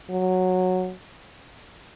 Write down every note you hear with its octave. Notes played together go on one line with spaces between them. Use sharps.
F#3